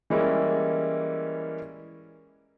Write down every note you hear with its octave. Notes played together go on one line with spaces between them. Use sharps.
E3 G3 G#3 A#3 C#4 E4